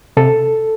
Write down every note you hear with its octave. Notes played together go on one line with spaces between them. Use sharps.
C3 A4